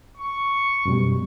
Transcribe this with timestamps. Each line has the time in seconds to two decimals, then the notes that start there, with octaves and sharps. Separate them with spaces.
0.18 C#6
0.85 F#2 B2 G3